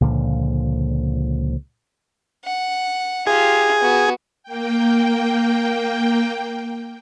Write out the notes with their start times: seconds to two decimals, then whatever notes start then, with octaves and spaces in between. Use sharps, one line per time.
0.01 C#2 A#2 D3 F3
2.45 F#5
3.27 F4 G4 G#4
3.82 B3 F#4
4.43 A#3 G5